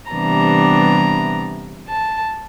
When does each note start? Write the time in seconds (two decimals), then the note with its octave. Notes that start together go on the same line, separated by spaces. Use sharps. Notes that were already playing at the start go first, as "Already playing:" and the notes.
0.11 C3 E3 G3 B3 D4 A#5
1.89 A5